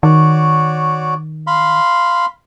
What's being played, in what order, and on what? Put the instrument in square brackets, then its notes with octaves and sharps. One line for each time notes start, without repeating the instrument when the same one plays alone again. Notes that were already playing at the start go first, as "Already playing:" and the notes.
[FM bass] D#3 [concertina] F#4 C#5 D5
[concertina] F5 B5 C6